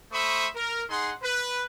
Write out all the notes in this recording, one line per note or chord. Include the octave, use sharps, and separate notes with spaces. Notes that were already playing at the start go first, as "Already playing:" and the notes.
A3 C5 E5 B5 C#6 D#6
A#4
D#4 G#4 F#5 C6
B4